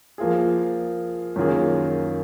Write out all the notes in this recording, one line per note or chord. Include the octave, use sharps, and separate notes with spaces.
F3 A#3 F4 G#4
F#2 D#3 A#3 F4 G#4